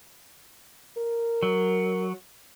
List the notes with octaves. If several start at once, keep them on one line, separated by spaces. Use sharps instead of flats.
A#4
F#3